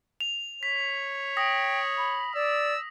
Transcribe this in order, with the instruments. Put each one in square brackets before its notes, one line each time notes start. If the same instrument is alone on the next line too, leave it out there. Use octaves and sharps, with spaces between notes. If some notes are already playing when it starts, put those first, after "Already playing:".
[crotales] F7
[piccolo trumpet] C#5 [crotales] B6
[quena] G5 [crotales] D#6 A#6
[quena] B5
[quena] D5 [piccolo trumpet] E6